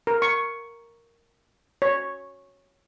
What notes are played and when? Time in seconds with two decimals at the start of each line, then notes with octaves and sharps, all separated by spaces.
0.07 A#4
0.22 C#6
1.82 C#5